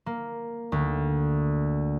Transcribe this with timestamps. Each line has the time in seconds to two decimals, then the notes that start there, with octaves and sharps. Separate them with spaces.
0.06 A#3
0.72 D2